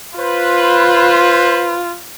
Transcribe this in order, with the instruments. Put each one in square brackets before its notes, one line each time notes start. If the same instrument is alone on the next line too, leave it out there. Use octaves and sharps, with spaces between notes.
[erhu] F4 [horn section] B4 C5